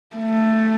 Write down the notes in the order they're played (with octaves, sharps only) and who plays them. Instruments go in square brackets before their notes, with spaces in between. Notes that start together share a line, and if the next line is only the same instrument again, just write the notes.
[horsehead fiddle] A3